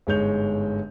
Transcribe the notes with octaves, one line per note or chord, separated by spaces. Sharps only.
G1 G#2 G#3 C#5 G6 F7